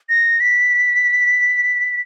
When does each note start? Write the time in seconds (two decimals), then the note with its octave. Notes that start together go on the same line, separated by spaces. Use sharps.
0.09 A#6
0.40 B6